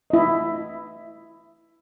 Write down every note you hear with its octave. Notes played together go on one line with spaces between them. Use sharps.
E4 D#5